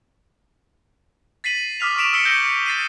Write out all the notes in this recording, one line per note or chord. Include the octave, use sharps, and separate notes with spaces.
A6 B6 C7 D#7 F#7
D6 D#6 F6 B6 F7
C#6 D6 B6 D7 E7 F7
D#6 E6 B6 C#7 G7
F6 G6 A#6 C#7 G7
A6 C7 D#7